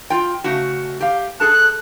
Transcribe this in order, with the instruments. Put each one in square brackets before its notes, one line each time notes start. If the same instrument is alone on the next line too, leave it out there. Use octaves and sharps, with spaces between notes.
[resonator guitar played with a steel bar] F4 G5
C#3 A3 F#4
G4 F5
[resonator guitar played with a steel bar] G#4 A4 A5 [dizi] F#6